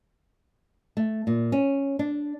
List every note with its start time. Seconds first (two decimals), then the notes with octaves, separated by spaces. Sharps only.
0.97 A3
1.27 A#2
1.52 C#4
1.99 D4